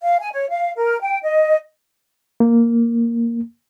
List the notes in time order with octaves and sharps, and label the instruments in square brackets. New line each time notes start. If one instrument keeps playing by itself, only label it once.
[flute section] F5
G#5
C#5
F5
A#4
G5
D#5
[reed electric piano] A#3